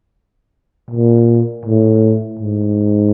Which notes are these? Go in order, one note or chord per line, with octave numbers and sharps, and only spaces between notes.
A#2
A2
G#2